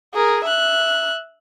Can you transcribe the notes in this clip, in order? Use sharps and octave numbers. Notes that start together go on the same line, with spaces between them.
G#4 A#4
E5 F#6